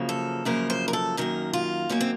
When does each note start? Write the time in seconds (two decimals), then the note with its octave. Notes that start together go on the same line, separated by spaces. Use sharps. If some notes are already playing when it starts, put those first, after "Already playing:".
Already playing: F#2 C#3 F3 A#3
0.09 A4
0.45 F#2 C#3 F3 A#3 A#4
0.70 C5
0.88 A#4
0.93 A4
1.17 F#2 D#3 A#3 A#4
1.53 F4
1.89 F#2 D#3 A#3 C#4
2.01 C4